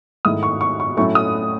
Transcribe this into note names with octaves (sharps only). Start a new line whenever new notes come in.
G#2 D#3 A3 E4 D#6
C#6
C#6
C#6
A2 F#3 A3 C#4 E4 C#6
D#6